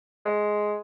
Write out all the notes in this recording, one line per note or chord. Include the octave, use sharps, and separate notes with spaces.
G#3